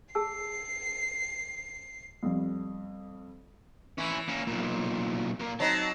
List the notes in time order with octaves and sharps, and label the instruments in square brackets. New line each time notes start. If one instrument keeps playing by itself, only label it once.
[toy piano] G#4 A5 E6 [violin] C7
[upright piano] F2 G3
[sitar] E3 [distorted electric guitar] C#4 E4
[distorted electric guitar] A#3 C#4
B1 A#2
A#2 A#3
[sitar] F#3 C4 D#4 [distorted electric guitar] A5